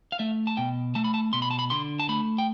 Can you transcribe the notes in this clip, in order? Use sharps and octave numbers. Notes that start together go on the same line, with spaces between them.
F5
A3 E5
A5
B2 G5
A3 A5
B5
A5
B2 C6
B5
A5
B5
D3 C6
A5
A3 B5
G5